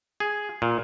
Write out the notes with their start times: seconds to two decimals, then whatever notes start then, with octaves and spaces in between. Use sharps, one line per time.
0.20 G#4
0.62 A#2